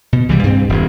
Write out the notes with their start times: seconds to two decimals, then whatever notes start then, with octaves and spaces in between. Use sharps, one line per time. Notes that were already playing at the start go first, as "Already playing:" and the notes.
0.13 B2
0.29 C2 E3 G3
0.44 G2 C4
0.69 D#1 G2